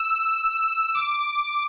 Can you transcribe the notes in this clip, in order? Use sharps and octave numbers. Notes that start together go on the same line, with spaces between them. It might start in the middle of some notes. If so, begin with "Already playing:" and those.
Already playing: E6
D6